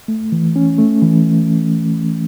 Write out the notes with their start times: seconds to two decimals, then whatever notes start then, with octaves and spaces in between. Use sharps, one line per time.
0.08 A3
0.32 E3
0.56 C#4
0.78 A3
1.02 E3